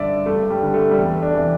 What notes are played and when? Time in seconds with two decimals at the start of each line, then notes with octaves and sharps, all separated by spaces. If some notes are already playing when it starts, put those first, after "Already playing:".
Already playing: G2 D3 D5 E5
0.26 G2 A3
0.50 G3
0.62 D3 G3
0.74 A3
0.91 G3
0.98 E2 A3
1.22 D4
1.35 C3 E3